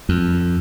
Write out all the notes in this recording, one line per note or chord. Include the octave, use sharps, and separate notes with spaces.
F2